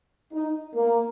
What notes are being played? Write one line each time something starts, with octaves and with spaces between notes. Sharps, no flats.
D#4
A#3